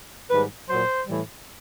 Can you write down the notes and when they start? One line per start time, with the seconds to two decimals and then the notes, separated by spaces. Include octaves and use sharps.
0.31 G#2 D#3 G3 B4
0.69 A#2 F#3 C5
1.06 A2 E3 G3